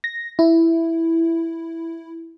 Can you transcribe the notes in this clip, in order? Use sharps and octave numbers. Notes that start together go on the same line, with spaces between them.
A#6
E4